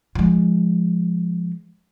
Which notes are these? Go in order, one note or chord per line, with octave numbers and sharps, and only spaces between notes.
F3 G#3